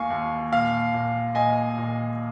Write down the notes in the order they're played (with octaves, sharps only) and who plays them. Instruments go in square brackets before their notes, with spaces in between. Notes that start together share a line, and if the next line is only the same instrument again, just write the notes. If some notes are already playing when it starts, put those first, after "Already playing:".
Already playing: [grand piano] D#2 F5 G#5 C#6
D#2
A#2 F5
A#2
A#2 D#5 G#5
A#2